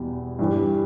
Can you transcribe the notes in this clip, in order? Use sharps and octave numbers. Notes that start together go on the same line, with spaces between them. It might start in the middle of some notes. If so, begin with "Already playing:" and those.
Already playing: E2 B2 G3
G2 E3 G3